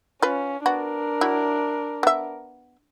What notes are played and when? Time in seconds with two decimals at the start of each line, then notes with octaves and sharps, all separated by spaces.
0.23 C#4 F4 B4
0.66 B3 D4 F#4 A#4
1.21 F#3 E4
2.03 B3 E5